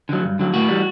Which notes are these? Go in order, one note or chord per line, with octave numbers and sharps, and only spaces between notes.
D3 F#3
G2
D3 F#3
A2 F#4
E3 G3